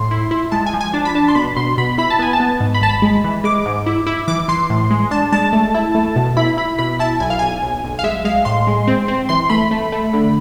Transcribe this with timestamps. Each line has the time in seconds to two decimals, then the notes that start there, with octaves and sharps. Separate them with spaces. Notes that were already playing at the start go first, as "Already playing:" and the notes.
Already playing: A2 C6
0.11 E4
0.31 E4
0.52 G#3 A5
0.66 G#5
0.73 F3
0.81 G#5
0.93 D4 A5
1.05 B5
1.15 D4 A5
1.28 C6
1.35 B2 B5
1.57 B2 C6
1.78 B2 B5
1.98 E4 B5
2.10 A5
2.19 B3 G#5
2.33 A5
2.40 B3
2.60 G#2
2.74 B5
2.81 G#1 A5
2.89 B5
3.02 G#3
3.24 E3
3.44 G#3 D6
3.66 G#2
3.86 E4
4.07 E4
4.28 E3 D6
4.48 E3 C6
4.70 A2
4.91 G#3
5.11 D4 A5
5.32 G#3 A5
5.53 A3
5.74 E4
5.95 A3
6.16 B2
6.37 E4 B5
6.57 E4 B5
6.79 B2 B5
6.99 E4 A5
7.20 B1 G#5
7.30 F5
7.39 B1 G#5
7.62 B1
7.84 B1
7.99 F5
8.04 G#3 E5
8.25 G#3 F5
8.45 A2 C6
8.67 G#3
8.87 C4
9.08 C4
9.29 E3 C6
9.50 A3 B5
9.71 A3
9.92 A3
10.13 D3